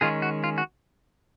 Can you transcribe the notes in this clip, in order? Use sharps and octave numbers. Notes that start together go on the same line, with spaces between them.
D#3 G#3 C#4 F4 G#4
F#4
F4
F#4